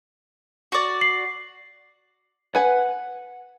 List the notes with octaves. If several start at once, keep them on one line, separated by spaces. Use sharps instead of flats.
F#4 D5
C7 F#7
B4 F#5 G#5